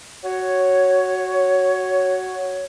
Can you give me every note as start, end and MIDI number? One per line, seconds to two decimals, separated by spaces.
0.24 2.66 66
0.24 2.66 73